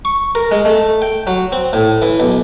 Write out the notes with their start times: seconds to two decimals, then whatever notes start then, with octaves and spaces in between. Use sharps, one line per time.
0.05 C#6
0.35 A#4
0.51 G#3
0.65 A3
1.02 G5
1.27 F#3
1.52 C4
1.73 A2
2.02 E3
2.20 B1